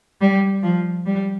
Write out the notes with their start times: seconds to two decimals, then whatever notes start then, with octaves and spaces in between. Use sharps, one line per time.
0.21 G3
0.63 F3
1.06 G3